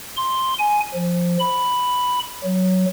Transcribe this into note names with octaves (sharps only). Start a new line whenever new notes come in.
C6
G#5
F3
B5
F#3